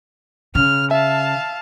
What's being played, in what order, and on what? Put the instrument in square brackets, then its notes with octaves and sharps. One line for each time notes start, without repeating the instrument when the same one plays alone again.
[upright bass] C#3 [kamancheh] F6
[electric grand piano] E5 [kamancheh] F5 A5